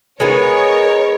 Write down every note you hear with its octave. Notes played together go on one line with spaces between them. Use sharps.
G#3 B3 D#4 A#4 C#5